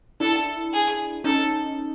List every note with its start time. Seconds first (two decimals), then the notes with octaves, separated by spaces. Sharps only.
0.20 D4 E4 A4
0.73 G#4
1.24 C#4 D#4 A4